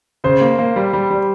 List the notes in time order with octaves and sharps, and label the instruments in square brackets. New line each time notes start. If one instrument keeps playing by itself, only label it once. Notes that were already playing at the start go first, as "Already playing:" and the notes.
[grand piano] C#3 [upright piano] C5
[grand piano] A#3
A#3
G3
G3
G3